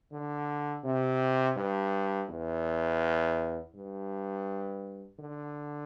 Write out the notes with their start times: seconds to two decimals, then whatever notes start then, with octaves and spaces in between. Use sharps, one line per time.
0.12 D3
0.84 C3
1.57 G2
2.29 E2
3.75 G2
5.20 D3